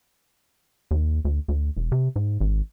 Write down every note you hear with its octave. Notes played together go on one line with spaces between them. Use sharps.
D#2
D2
D2
E1
C3
G#2
G#1